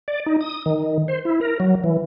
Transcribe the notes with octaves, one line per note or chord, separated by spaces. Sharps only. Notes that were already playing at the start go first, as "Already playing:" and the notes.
D5
D#4
D#6
D#3
C5
E4
A#4
F#3
E3